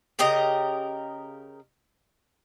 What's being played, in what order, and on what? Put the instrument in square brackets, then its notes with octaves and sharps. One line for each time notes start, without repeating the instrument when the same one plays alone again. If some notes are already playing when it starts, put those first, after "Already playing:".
[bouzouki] C#3 G4 A#4 D#5